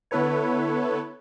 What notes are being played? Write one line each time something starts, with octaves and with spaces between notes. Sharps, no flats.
D3 B3 E4 A4 B4 C#5